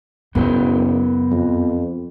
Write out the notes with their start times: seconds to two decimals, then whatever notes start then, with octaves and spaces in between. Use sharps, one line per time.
0.35 F#1 F#2 C#3 B3 A#4 C5
1.31 F2